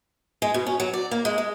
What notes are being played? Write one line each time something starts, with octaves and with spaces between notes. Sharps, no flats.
G#3
B2
C#4
F#3
D5
A#3
G#3
G#3